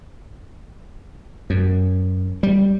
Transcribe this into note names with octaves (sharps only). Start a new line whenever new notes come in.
F#2
G3